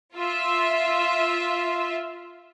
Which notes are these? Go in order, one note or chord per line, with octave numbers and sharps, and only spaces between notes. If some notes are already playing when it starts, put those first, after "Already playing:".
F4 E5